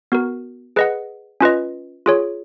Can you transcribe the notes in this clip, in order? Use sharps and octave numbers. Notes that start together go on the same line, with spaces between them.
B3 F#4 A#4
G#4 B4 D#5 F#5
C#4 F4 B4 D#5
F4 G#4 C#5